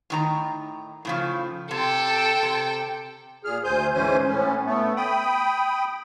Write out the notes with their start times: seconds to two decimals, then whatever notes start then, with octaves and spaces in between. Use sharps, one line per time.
0.10 A2 D#3 A#5
1.05 A2 C#3 F3
1.71 C3 A4 G5
2.43 C3
3.44 A#2 G#4 F6
3.64 D2 C5 G#5 G6
3.94 G#2 E3 C#4 C5 G#5
4.26 A2 C#4
4.65 A3 B3
4.96 G5 B5 D#6